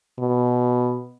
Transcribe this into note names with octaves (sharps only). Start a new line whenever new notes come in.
B2